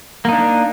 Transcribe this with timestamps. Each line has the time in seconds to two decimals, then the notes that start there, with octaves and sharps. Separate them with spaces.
0.25 A#3
0.29 D#4
0.32 D4